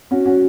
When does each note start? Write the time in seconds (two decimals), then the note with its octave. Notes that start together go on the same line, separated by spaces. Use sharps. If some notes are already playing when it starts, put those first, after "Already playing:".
0.11 C#4 F#4
0.26 C#4 F#4